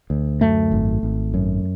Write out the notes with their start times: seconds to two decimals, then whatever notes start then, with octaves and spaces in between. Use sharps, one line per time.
0.10 D2
0.41 F#2 A3
0.72 G#1
1.03 G#1
1.34 F#2